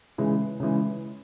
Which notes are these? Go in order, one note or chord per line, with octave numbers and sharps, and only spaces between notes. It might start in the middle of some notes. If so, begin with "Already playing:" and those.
C#3 E3 G#3
C#3 E3 G#3